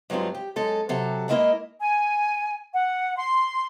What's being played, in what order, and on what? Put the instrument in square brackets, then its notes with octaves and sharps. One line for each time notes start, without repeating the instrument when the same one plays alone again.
[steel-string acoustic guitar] G2 F#3 G#3 C4 F4
G4
F#2 G#3 A4
C3 F#3 A4
G#3 A#3 E4 A#4 D#5
[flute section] G#5
F#5
C6